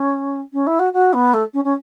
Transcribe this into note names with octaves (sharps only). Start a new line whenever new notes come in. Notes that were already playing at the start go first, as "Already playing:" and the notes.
Already playing: C#4
C#4
E4
F#4
F#4
B3
A3
C#4
C#4